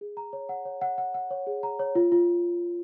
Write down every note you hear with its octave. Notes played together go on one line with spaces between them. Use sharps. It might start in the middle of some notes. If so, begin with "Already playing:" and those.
G#4
A#5
C#5
F#5
C#5
F#5
F#5
F#5
C#5
G#4
A#5
C#5
F4
F4